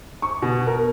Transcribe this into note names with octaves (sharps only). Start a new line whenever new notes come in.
C#6
B2
A#4